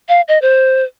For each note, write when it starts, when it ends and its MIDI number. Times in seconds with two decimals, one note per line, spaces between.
0.09 0.21 77
0.28 0.39 75
0.42 0.84 72